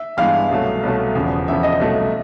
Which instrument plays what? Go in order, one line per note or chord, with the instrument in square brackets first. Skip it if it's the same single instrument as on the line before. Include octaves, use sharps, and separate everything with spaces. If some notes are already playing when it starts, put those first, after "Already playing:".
Already playing: [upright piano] E5
[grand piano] G2 E3 G#3 B3 [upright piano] F5
[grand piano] C2 B2 F#3 A3
C2 B2 F#3 A3
E1 E2 C#3 F3
[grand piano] E1 E2 C#3 F3 [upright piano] E5
[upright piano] D#5
[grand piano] C2 B2 F#3 A3